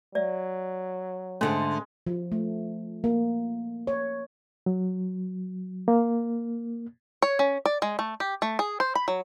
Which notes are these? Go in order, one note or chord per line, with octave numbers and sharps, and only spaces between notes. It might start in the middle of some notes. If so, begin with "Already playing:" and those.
F#3 D5 E5
G#2 D3 G#3 A3 C#4
F3
A3
A#3
C#5
F#3
A#3
C#5
C#4
D5
G#3
A3
G4
A3
G#4
C5
B5
F#3